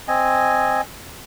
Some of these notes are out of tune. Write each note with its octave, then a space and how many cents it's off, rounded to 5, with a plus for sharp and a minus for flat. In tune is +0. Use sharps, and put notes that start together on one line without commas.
C4 +0 D#5 +0 G#5 +0